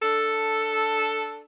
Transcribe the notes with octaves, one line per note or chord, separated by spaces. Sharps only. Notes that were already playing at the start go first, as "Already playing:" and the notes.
D4 A4